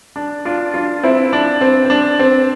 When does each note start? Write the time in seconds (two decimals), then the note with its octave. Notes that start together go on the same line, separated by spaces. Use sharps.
0.16 D4
0.45 D4 F4
0.74 D4 F4
1.03 C4 E4
1.33 D4
1.61 C4
1.85 C4
1.90 D4
2.19 C4